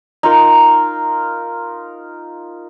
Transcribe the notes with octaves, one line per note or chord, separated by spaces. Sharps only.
D#4 F4 A#4